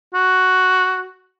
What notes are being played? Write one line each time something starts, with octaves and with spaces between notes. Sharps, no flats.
F#4